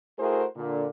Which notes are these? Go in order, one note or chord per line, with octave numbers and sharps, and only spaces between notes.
A3 E4 F#4 G#4 A#4 C5
A#2 D3